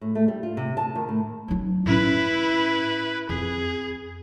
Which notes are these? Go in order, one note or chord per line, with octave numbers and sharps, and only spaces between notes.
A2
A3
G3
F4
C3
A5
D#3
A2
F#3 D#4
A2 C#4 E4 B4
F2 G#4